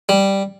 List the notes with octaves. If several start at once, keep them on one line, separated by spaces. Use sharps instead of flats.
G3